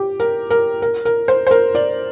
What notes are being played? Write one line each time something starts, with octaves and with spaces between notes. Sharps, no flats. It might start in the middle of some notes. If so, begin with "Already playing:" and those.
Already playing: G4
A#4
A#4
A#4
A#4
C5
C5
A#4
D5